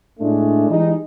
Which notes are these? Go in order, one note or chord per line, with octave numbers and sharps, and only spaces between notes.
A2 G#3 A3 D4
E3 G3 G#3 D#4